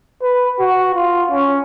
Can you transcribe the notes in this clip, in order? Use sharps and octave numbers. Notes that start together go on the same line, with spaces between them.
B4
F#4
F4
C#4